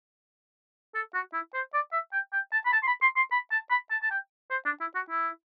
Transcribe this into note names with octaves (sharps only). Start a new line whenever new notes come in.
A4
F#4
E4
C5
D5
E5
G5
G5
A5
B5
A5
C6
B5
C6
C6
B5
A5
B5
A5
A5
G5
C5
D4
E4
F#4
E4